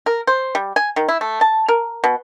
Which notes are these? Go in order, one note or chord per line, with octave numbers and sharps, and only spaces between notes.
A#4
C5
G3
G#5
D#3
E4
A3
A5
A#4
B2